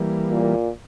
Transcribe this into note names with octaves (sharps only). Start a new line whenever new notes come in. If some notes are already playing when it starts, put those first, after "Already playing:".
Already playing: E3 G3 A#3
A#2